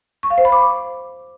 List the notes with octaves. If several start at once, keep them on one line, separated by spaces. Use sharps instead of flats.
C#6
F5
C5
B5
D6